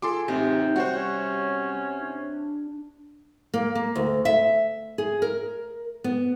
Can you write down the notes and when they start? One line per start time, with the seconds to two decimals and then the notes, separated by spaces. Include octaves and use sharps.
0.02 F4 G#4 A4 C6 D6
0.28 A1 C3 D#4 G5
0.76 G3 F#4 C5 C#5 F#5
0.95 C#4
2.01 D4
3.54 A#3
3.75 A#3
3.96 D2
4.25 E5
4.98 G#4
5.22 A#4
6.04 B3